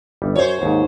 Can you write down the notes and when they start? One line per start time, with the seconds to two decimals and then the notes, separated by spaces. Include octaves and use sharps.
0.22 G1 G3
0.36 F#2 C5 C#5
0.62 D#2 G#2